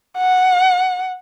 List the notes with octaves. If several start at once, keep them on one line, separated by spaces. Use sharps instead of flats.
F#5